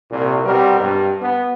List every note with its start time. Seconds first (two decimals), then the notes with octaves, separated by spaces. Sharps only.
0.11 C2 A#2
0.45 B2 G3 C4 A#4
0.79 G2
1.21 B3